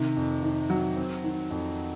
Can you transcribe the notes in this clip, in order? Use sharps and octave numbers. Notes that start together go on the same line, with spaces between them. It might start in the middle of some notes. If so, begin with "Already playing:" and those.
Already playing: C3 D#3
F2
D#3
F#3
C4
D#3
F2